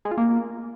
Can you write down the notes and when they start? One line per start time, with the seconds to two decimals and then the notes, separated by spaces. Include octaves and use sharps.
0.05 G#3
0.11 F4
0.17 A#3